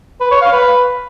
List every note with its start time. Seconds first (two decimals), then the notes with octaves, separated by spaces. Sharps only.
0.21 B4
0.31 C#5
0.42 F5
0.53 B4